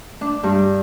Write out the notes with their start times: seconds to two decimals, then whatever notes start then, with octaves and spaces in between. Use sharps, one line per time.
0.21 D4
0.43 G2